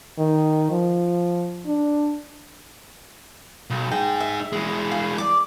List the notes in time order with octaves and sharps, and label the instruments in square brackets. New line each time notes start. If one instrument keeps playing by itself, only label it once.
[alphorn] D#3
F3
D4
[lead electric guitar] B1
[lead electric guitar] D#4 G#4 [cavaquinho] G5
[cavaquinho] E5
[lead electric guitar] E3 G#3
[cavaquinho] G#4 F5
D5 D6